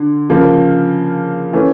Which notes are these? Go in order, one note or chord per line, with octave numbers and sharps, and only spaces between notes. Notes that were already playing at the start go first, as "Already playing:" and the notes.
Already playing: D3
C#3 F3 A#3
E3 A3 C#4